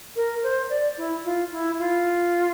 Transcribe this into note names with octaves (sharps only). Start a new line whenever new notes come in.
A#4
C5
D5
E4
F4
E4
F4